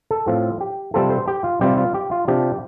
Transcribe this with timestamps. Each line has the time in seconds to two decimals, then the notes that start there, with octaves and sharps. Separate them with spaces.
0.11 A4
0.27 A2 F3 C4 F4
0.61 G4
0.94 C3 G3 C4 F4 A4
1.10 C5
1.28 G4
1.44 F4
1.61 C3 G3 C4 F4 G4
1.78 F4
1.94 G4
2.11 F4
2.28 C3 F3 D4 F4 G4